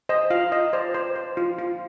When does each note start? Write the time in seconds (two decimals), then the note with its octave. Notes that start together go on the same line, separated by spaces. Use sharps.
0.09 C5 D#5
0.30 F4 F5
0.52 F4 D#5
0.73 C5 D5
0.94 C5
1.16 C5
1.37 F4
1.59 F4